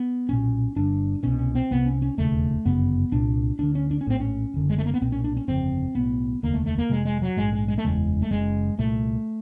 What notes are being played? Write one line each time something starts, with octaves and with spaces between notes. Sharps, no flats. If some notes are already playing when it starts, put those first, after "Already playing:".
Already playing: B3
B1 A#2 C#4
G1 G2 D3 D4
C2 B2 C#4
C#4
C4
C2 C3 B3
C#4
C#4
E1 D#2 C#3 A3
G1 F#2 C#3 B3
C2 A#2 D4
D2 D3 D4
C#4
D4
C#4
A#1 A2 C4
C#4
F#1 F#2 D3
G#3
A3
A#3
B3
B1 A#2 C4
C#4
D4
C#4
G1 F2 C#3 C4
B1 A2 B3
F1 D#2 D3 A#3
A3
A3
A#3
F1 F2 C3 G#3
G#3
F#3
A#1 G#2 G#3
G#3
G#3
A3
F#1 E2 C#3 G#3
A3
F#1 F#2 C#3 G#3
C2 A#2 A3